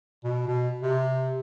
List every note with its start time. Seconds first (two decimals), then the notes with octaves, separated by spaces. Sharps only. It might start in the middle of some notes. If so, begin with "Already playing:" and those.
0.24 B2
0.48 B2
0.82 C3